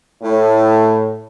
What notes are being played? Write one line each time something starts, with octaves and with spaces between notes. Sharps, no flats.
A2